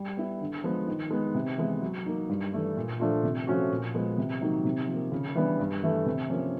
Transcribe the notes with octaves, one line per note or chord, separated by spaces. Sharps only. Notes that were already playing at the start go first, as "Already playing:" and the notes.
Already playing: G3
B3 E4
D3
F3 G#3 B3
D#3
G#3 B3
C3
E3 G#3 B3
F#3
A#3 D#4
G2
E3 A3 D4
A#2
F3 A3 D4 F4
C3
F3 A3 C#4 F#4
A#2
F3 G#3 B3
C3
D#3 F#3 A#3 D#4
C3
F3
A#3
C#3
E3 G3 B3 D4
G2
E3 A3
C3
F3 A#3 C#4